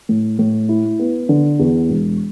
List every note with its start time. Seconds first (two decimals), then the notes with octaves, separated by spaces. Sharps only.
0.09 A2
0.39 A2
0.69 E4
0.99 B3
1.29 D3
1.59 E2
1.89 E1